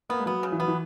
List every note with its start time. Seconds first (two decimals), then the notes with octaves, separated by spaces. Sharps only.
0.09 A#3 B3
0.19 G#3
0.26 F#3 B3
0.43 C#3
0.52 E3
0.60 F#3 B3
0.68 E3